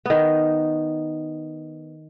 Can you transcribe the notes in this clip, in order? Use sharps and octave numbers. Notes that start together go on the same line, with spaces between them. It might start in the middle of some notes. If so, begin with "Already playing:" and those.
D#3 B3